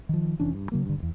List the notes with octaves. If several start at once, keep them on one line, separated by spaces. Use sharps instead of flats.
D#3 F3
F1 E3 C#4 D4
G2
C#3 F#3 A#3
G2 D3
D#1 E2